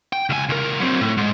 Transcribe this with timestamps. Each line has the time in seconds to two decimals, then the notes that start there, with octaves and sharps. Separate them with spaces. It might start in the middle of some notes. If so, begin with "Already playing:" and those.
0.13 G5
0.29 C#2 G#5
0.49 C#2 A#4
0.80 F#3 C4
1.01 A2
1.17 G#2 G#3